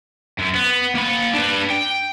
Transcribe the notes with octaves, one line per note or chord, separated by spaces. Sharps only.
F#2
B3
A#3 B5
D4 B4
G5